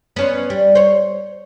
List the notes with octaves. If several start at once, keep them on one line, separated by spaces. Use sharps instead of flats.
B3 C#4 C5
G3
C5 C#5